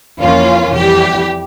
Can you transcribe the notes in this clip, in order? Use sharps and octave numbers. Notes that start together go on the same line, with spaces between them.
F2 E3 A#3 C#4 F4
F2 E3 G3 G4